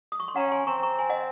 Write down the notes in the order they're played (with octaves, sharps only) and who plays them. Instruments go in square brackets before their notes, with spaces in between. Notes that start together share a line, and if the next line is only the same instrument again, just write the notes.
[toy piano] D#6
C#6
C6
[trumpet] C#4 [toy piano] F#5 A#5
[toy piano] G#5 C6
[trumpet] C4 [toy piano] A#5 C#6
[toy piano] A#5 C#6
G#5 C6
D#5 F#5